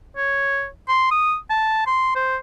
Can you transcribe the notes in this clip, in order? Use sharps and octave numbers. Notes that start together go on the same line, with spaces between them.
C#5
C6
D#6
A5
C6
C5